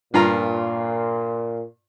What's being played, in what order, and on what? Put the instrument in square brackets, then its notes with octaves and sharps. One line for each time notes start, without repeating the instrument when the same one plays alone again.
[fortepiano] G2 F4 A#5 [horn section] A#2